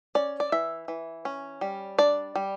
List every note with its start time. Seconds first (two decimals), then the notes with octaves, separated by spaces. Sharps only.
0.15 C#4 D5
0.40 D5
0.52 E3 E5
0.88 E3
1.25 C#4
1.61 G3
1.98 D4 D5
2.35 G3